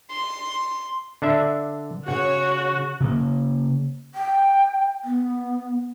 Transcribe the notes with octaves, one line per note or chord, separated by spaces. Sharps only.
C6
D3 D4 E5
C#3 F#4 C#5 F#5
C#3 A#3
G5
B3